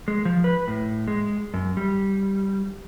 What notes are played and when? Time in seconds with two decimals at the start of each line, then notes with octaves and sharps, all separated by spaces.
0.08 G#3
0.25 F3
0.44 B4
0.68 A2
1.08 G#3
1.54 F#2
1.77 G3